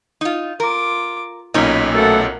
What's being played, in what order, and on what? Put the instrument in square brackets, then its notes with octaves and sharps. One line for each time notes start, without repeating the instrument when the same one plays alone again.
[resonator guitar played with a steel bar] D#4 F4
[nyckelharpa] F4 D6 [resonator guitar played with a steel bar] A#4
[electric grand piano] B1 A#2 [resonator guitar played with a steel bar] C#4 D#4 [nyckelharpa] B5
[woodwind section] B2 A3 A4 [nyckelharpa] A#4 F#5